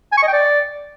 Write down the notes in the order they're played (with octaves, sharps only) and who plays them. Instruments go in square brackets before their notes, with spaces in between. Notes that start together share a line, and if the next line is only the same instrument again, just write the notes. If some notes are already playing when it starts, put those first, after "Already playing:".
[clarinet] G#5
C#6
D#5
G5
D5